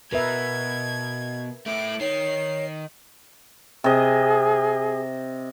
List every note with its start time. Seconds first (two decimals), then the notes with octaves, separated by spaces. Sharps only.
0.13 B2 A#4 B4 E5 G#6
1.66 A3 E4 D6
2.01 D#3 C#5 C7
3.84 C3 G#4 D#5